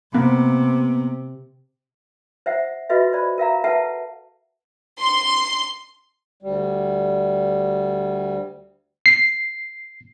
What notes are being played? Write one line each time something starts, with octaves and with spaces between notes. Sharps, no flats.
C3 A#3 B3
C5 E5 F#5
F4 F#4 A4 B4 D#5 E5
C5 D5 B5
A#4 E5 F5 A#5
A4 B4 E5 F#5 A5
C6
D2 G3
C7